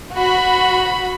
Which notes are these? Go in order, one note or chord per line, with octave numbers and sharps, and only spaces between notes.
F#4 B5